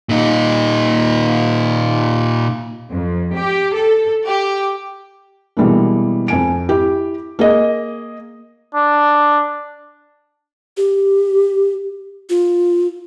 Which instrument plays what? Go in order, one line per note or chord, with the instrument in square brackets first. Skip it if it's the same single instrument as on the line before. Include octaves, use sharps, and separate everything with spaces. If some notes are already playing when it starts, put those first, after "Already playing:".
[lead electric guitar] A#2 D#4
[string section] F2
G4
A4
G4
[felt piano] B2 E3 G3 G#3 A#3
F2 G#5 D7
E4 G4
A#3 G#4 D#5
[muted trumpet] D4
[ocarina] G4
F4